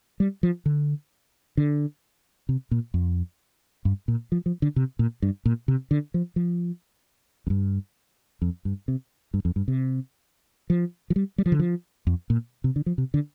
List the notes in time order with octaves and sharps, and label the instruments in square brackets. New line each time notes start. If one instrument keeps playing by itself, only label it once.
[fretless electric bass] G3
F3
D3
D3
C3
A#2
F2
G2
A#2
F3
F3
D3
C3
A#2
G2
A#2
C3
D3
F3
F3
F2
G2
F2
G2
C3
G2
F2
G2
C3
F3
F3
G3
G3
F3
D3
F3
F2
A#2
C3
D3
F3
C3
D3